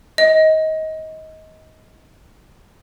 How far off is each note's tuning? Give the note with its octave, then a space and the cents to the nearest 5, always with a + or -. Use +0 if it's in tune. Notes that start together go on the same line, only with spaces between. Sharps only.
D#5 +25